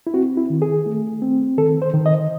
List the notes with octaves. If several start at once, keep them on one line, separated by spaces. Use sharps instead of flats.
E4
C4 F#4
E4
D#3
G#4
A3
C4
D#3 A4
C5
D#3
D#5